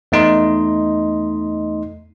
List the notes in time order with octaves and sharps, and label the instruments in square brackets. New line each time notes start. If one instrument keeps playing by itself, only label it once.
[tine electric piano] E2 A3 D#4 D#5 C6